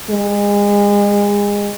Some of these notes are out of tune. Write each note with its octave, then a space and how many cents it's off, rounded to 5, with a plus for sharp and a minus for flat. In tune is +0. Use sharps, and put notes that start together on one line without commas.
G#3 -30